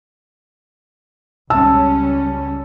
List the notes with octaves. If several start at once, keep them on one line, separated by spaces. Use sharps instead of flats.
C#2 G3 C#4 A5 E6